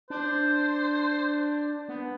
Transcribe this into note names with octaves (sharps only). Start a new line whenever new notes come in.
D4 C5
B3